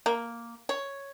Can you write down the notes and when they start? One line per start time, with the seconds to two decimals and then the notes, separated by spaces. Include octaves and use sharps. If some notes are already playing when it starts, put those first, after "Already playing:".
0.06 A#3
0.69 C#5